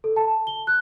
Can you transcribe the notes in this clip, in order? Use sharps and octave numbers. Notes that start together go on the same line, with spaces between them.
A4
A5
G7
F#6